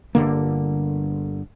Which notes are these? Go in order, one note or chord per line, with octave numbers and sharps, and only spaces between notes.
G1 E2 D3 A#3